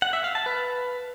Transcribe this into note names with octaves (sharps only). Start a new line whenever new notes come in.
F#5
E5
F5
A5
B4